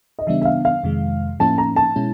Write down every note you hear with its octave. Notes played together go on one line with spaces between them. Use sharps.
D#5
C#3 E3 G3 B3 D4 E5
E5
F5
F5
F2 C3 D#3 G#3
A2 F3 A#3 C#4 E4 A5
A#5
A5
B2 G#3 C#4 E4